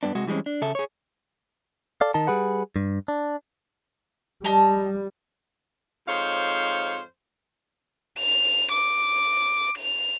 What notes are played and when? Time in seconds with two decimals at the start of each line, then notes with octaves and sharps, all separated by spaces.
0.03 G2 B3 D4
0.15 C3 G#3 F#4
0.27 E3 G3 G#3 C4 C#4
0.46 D4
0.62 C#3 A4 E5
0.75 G#4 C#5
2.01 A4 D5 F5
2.14 D#3 D#4 A#4 A5
2.27 G3 G#4 B4 F#5
2.76 G2
3.08 D4
4.44 G3 D#5 A5 A#5
6.07 F2 G#2 C5 C#5 D#5 F5
8.19 F7
8.72 D6
9.78 F7